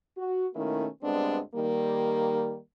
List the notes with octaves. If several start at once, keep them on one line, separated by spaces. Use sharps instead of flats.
F#4
B2 D#3 A3 A#3 C#4 E4
D2 G2 G#3 B3 C4 D4
D#3 G3 A#3